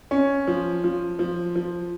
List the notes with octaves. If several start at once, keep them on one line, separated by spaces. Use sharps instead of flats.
C#4
F3
F3
F3
F3